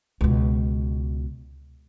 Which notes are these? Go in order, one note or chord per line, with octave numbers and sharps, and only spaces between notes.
C#2 B2